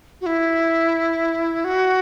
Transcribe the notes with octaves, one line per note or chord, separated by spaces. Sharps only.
F#4
E4
F#4